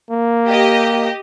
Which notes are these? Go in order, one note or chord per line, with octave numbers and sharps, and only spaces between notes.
A#3
G4 D#5